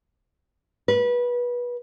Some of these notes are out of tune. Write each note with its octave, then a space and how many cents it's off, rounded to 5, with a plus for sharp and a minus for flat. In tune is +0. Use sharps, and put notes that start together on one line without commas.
B4 -25